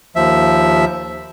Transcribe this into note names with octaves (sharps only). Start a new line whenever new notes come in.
D#2 F3 E5